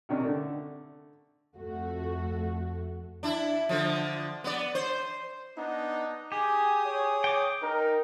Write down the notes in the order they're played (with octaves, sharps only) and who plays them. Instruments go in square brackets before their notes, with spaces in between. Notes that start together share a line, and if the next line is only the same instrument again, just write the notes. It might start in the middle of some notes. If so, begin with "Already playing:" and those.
[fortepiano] C3 D#3 C#4 D4
D3 A3
[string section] F2 A3 F#4
[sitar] D4 E4
D3 F3
B3 D5
C5
[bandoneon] B3 D4 [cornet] D#4
[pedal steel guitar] G4 [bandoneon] G#4 D#6 [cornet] G#5
[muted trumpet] C#5
[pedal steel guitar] G5 D6
[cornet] D#4 [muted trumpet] A#4